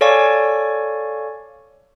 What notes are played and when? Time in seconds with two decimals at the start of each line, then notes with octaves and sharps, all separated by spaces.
0.01 A4 C#5 D5 F5 G#5 C#6